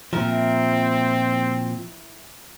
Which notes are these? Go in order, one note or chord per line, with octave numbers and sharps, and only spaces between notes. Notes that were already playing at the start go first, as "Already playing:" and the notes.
A#2 F3 C4 E4 A#4